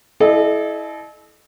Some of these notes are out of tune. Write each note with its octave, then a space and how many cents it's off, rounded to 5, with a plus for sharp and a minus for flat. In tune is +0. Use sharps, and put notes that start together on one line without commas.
E4 -10 A4 -40 D#5 -40